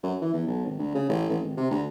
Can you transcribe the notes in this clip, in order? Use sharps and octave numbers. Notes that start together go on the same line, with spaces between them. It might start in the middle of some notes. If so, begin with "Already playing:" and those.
F#2
E3
E2
B1
G#1
D2
C#3
A1
A1
G#1
C3
D2